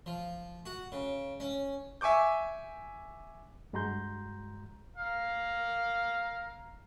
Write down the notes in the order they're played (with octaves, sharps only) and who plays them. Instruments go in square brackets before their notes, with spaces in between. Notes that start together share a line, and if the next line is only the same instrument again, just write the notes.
[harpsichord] F3
F#4
C#3
C#4
[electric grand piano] E5 G#5 C#6 D6 G6
[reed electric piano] G2 G#3 F#4 A#5 C6 G6
[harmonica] F5 A#5